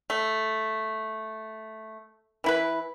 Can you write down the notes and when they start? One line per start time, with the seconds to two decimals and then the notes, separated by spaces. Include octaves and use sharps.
0.10 A3
2.44 E3 E4 B4